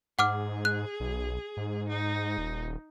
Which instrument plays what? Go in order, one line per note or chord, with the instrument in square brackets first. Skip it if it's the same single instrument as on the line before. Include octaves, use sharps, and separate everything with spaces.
[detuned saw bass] G#2 [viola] G#4 [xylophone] F#5 D6 F6
[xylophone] F#6
[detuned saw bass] B1
G#2
[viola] D#4
[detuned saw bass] D#1